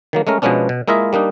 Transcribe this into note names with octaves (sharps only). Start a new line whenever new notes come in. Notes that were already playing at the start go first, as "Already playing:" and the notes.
D#3 F#3 A#3
G#3 A3 C#4 A#4
B2 F3 G#3 B3 C#4 D4
B2
G#3 A#3 E4 F4 D#5 E5
G3 A#3 D4 D#4